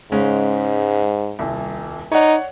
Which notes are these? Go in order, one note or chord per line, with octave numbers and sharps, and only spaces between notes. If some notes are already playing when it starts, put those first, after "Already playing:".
G#2 C#3 G#3 C#4
D#1 C2
D#4 C#5 D5 F#5